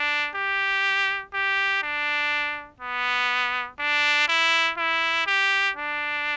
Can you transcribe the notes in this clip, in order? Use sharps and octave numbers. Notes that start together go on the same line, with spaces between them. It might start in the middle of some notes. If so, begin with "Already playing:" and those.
Already playing: D4
G4
G4
D4
B3
D4
E4
E4
G4
D4